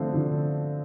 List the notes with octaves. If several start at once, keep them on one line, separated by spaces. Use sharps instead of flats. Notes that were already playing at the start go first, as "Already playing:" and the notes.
Already playing: D3 F3 A3 C4
D3